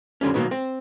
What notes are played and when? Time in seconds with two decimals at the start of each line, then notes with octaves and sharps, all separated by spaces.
0.21 F2 D3 G3 C#4
0.34 B2 D#3 F#3 A3 A#3
0.51 C4